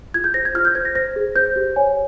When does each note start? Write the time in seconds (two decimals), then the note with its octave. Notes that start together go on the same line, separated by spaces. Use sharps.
0.14 F4 G#6
0.24 G6
0.34 C5 A#6
0.45 G#6
0.55 F4 F6
0.65 G6
0.75 C5 G#6
0.85 A#6
0.95 C5 A#6
1.16 G#4
1.36 C5 G6
1.56 G4
1.76 C#5 G#5